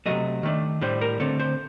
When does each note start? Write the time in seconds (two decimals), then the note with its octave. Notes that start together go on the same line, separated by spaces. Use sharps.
0.06 C3 D#3 F#3 A3 D#5
0.43 D#3 A3 D4
0.81 A2 G3 D4 C5
1.01 A#4
1.20 D3 A3 C4 A4
1.40 C5